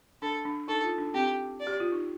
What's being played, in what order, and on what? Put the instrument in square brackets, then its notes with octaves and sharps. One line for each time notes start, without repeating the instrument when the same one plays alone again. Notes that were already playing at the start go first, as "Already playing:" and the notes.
[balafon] D4 [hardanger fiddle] A4
[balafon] D4
[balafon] D#4 [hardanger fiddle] A4
[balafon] F4
D4
[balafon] C4 [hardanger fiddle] G4
[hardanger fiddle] D5
[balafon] G4
F4
D#4